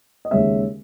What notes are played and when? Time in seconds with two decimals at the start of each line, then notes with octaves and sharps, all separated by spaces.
0.25 D#5
0.31 D#2 C#3 G#3 C#4 E5